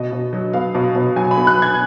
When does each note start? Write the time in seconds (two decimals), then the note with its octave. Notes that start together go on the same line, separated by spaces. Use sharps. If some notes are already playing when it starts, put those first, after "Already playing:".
Already playing: B2 D#5
0.12 B2
0.33 F#3
0.53 B3 F5
0.75 B2
0.95 B2
1.16 F#3 G#5
1.31 B5
1.37 B3
1.47 F#6
1.57 B2 G#6